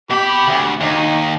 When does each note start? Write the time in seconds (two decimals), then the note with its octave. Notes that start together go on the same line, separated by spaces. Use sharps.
0.11 B2 G4 B5
0.48 D2
0.81 D#2 D#4